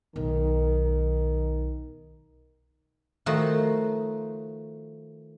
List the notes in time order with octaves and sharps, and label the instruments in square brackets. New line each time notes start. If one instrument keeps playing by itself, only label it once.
[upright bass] B1 [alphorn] D#3
[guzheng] D#3 F3 A3 D#4 F#4